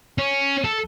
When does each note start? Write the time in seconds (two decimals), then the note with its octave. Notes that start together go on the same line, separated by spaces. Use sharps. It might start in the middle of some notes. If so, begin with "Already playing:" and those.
0.18 C#4
0.64 A4